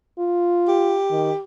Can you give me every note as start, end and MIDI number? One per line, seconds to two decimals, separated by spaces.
0.19 0.98 65
0.68 1.43 67
1.11 1.31 51